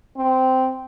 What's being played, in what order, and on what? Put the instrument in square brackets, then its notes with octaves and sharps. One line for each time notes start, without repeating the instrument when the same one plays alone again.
[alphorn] C4